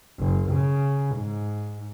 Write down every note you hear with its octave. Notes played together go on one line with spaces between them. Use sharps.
F#1
C#3
G#2